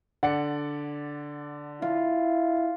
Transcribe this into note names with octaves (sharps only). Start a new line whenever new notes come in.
D3 D5 F#5 C#7
E4 F4